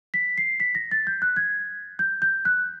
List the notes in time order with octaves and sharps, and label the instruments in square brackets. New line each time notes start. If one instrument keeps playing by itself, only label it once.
[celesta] B6
C7
B6
A#6
A6
G6
F#6
G#6
G6
G6
F#6